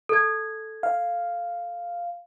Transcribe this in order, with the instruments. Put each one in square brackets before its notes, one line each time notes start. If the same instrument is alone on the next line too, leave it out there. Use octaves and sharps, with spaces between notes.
[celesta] A4 G#6
[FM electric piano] F5